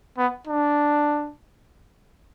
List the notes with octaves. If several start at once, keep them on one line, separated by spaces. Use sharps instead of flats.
B3
D4